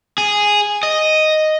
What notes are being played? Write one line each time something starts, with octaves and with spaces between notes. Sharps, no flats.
G#4
D#5